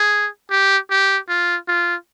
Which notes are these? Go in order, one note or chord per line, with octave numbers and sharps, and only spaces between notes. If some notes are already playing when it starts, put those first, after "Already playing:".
Already playing: G#4
G4
G4
F4
F4